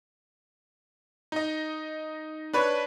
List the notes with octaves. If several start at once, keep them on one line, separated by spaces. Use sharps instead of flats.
D#4 D#5
D4 B4 C#5